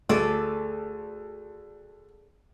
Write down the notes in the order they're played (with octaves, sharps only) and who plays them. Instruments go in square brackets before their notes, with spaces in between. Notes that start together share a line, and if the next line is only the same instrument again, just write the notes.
[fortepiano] D2 [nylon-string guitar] G#4 A4 D5